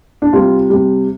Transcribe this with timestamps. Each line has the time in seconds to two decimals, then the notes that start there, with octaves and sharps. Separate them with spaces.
0.22 D4
0.33 C3 G3 F4
0.70 C3 G3